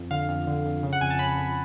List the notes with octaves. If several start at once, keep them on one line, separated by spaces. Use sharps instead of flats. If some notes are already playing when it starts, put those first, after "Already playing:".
Already playing: F2
D3 F5
F2
D3
F2
C#3
F#5
F2 G#5
A5
C#3 B5
F2